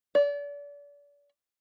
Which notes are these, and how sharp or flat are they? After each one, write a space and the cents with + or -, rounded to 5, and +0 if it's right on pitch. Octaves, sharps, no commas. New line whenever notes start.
D5 -35